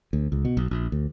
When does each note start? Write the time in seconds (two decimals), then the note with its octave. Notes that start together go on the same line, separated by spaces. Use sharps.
0.13 D2
0.32 C#2
0.45 B2
0.57 B1
0.71 A#1
0.92 D2